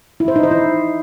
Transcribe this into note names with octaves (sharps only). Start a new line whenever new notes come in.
E4
C5
D#4
C5
E4